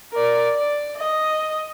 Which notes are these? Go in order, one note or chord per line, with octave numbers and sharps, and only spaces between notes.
A#4 D5
D5
D#5